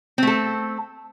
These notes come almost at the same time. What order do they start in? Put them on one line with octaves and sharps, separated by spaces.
C4 A3 A4